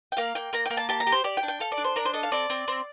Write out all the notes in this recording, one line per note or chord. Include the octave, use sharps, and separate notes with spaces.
G5
A#3 F5
A#3 G5
A#3 A#5
A#3 G5
A5
G4 A5
A#5
G4
C5
G4 D5
G5
D4
G5
A4 F5
D5
D4
C5
D4 A#4
C5
A4 D#5
F5
C4 D5
C4
C4